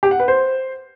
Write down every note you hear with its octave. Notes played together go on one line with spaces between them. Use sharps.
G4
F#5
B4
C5